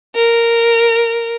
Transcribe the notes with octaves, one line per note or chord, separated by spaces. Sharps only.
A#4